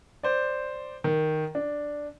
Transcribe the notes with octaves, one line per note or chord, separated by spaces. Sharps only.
C5 D5
D#3
D4